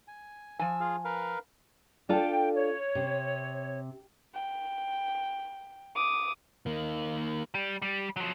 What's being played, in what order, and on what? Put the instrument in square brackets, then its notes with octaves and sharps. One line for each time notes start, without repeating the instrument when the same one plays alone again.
[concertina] G#5
[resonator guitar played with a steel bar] F3 G#5 [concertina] E6
[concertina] F4 G#4 F5
A#4 B4 F5
[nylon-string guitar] D4 F4 A4 [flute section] G5
[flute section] C#5
[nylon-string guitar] C3
[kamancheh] G5
D6 D#6
[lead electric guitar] D#3 A#3
G3
G3
F3 F#3